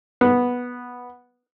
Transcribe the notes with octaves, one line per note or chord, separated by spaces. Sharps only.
B3